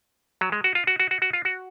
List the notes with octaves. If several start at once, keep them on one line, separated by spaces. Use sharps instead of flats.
F#3
G#3
F#4
F4
F#4
F#4
F#4
F#4
F4
F#4